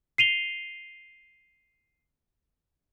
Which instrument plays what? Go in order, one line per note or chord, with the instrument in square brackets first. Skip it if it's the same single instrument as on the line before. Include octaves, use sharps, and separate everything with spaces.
[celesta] C7 D#7 F7 G7